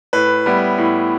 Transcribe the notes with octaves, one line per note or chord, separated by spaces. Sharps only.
A2 B4
G3 B3 E4
A2